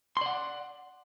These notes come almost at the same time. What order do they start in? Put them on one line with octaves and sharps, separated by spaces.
C6 D5 F#5